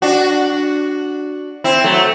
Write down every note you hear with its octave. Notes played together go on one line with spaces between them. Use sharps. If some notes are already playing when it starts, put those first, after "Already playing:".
D4 F#4
C4 E4
F#3 A3